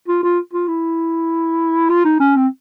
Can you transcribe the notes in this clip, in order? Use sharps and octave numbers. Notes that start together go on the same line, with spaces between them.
F4
F4
F4
E4
F4
D#4
C#4
C4